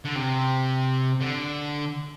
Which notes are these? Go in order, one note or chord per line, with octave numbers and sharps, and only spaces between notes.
D3
C3
D3